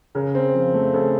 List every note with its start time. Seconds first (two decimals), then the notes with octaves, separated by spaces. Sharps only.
0.15 C#3 A#4
0.35 C4
0.54 F3
0.74 A3
0.94 C#3 A4